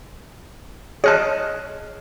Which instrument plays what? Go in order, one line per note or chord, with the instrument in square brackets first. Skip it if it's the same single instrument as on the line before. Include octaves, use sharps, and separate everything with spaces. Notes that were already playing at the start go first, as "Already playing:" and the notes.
[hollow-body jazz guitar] G#4 D#5 A5 [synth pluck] C#5 F6 F#6